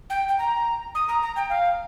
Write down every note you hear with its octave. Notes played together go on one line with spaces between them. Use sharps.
G5
G5
A#5
D#6
A#5
A#5
G5
F5